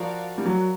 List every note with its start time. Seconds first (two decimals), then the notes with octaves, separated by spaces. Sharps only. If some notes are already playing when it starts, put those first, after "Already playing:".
Already playing: F3 F#4 A#4 D5 F5
0.38 G3
0.45 F#3